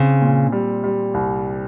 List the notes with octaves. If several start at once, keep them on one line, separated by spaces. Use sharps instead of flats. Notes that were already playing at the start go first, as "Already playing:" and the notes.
Already playing: C#3 C4
A#2
G3
G3
C2